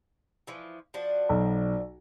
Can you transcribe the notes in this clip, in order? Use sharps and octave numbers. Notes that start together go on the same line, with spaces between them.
E3 F3
F3 D4 F#4
B1